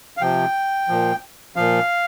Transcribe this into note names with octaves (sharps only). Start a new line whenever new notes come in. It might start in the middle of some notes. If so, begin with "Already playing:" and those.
F5
C3 F3 G5
A#2 F3
A#2 F3 F5